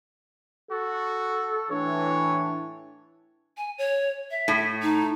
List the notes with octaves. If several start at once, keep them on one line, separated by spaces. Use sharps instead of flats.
F#4 A4
A2 E3 D4 C#5
G#5
C#5
E5
A2
D#4